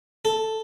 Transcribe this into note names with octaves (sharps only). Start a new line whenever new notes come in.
A4